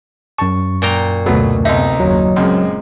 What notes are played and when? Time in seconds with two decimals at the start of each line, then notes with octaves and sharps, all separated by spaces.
0.38 F#2 A5 C#6
0.82 A#2 G5 A#5
1.26 D2 B2 F#3 A3 B3
1.65 B1 C3 D#4 E5
2.00 F#1 D#2 F#3
2.36 C#2 F#2 G#3 C4